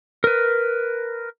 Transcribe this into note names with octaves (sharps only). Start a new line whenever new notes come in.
A#4 B4